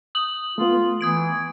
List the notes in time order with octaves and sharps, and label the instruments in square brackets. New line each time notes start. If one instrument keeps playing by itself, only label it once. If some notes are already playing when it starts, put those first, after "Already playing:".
[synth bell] D#6 F#7
[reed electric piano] A3 B3 [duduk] F4
[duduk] E3 [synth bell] D#6 G#6 D7